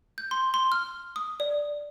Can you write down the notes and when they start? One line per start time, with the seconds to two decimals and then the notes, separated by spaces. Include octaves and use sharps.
0.18 G6
0.31 C6
0.54 C6
0.72 F6
1.16 D#6
1.40 D5